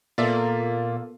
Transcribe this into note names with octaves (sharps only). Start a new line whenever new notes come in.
A#2 A#3 B3 F4 A4 A#4 D5 E5